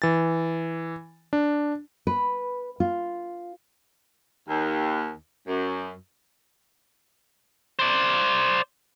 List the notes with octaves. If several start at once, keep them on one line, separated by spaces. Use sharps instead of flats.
E3 A6
D4
B4
F4
D#2
F#2
C5 D5